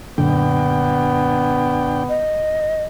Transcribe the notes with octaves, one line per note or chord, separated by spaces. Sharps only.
F#2 A#2 D3 B3 D4 G5
D#5